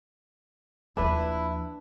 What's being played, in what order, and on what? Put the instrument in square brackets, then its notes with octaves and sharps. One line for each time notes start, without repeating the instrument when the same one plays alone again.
[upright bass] D#2 F3 [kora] D4 B4 [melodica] E4